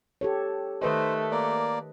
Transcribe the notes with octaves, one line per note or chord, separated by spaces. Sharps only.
G4 A4 C#5
D#3 A3 B4 C5 D#5
A#3 D5